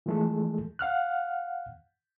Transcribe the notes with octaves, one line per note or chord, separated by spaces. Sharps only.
E3 F3 G#3 A3 G#4 A4
F5 F#5 F6 F#6